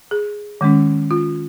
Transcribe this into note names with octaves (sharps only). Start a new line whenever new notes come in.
G#4
D#3 G#3 C#4
F4